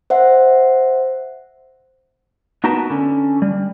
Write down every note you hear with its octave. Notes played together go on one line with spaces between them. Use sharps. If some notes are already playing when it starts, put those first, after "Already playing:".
C5 E5 F#5
B3 D#4 F#4 A#4 B4 A5
D3 C#4
G3